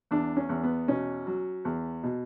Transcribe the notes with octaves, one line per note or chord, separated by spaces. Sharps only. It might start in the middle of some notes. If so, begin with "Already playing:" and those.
E2 D4
C#4
E2
B3
B2 C#4
F#3
E2
B2